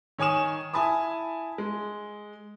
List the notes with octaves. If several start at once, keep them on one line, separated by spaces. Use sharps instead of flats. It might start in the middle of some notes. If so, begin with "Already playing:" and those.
D#3 C#5 G#5 D#6 E7
E4 G#5 A5 B5 D#6
G#3